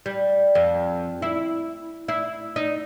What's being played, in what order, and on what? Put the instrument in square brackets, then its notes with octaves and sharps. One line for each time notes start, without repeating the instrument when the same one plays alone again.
[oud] G3
F2
E4
E4
D#4